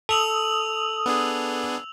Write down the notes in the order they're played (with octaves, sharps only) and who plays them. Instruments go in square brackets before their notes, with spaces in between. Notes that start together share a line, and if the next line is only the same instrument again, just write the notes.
[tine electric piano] A4 [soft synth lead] D#6 [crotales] E6 F7 F#7
[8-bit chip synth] B3 D4 G#4